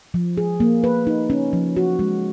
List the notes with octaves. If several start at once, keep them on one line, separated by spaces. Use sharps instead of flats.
F3
G#4
A#3
B4
D#4
C#4
F3
F#4
G#3